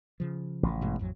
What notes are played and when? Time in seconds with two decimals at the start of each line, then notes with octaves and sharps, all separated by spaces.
0.20 C#3 F3
0.63 A1 A2
0.81 G2 B2 G#3
0.99 A1 F2 F#3